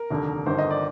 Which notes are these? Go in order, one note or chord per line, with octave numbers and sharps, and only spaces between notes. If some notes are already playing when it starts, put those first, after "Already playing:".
Already playing: A#4
F1 D#2 D3
G1 G2 D#3 C5
D#5
D5